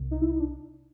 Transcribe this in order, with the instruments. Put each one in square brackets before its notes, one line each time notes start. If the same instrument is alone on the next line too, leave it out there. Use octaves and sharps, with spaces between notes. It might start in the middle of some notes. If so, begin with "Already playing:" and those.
Already playing: [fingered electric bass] C2 C3
[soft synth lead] D#4
E4
D#4
D4